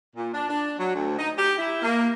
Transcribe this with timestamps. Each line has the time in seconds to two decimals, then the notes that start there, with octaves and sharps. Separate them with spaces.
0.16 A#2
0.33 D4
0.48 D4
0.78 F#3
0.94 D2
1.17 D#4
1.37 G4
1.58 E4
1.82 A#3